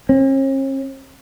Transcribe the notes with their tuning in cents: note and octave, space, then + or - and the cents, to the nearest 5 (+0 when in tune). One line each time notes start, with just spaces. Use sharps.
C#4 -45